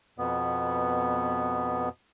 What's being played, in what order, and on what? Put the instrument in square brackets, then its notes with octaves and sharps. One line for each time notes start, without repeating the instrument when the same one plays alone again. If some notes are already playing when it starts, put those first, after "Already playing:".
[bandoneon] F2 B2 B3